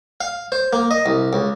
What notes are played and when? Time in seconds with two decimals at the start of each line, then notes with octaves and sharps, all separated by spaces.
0.21 F5
0.52 C5
0.73 A#3
0.91 D#5
1.06 C2
1.33 C#2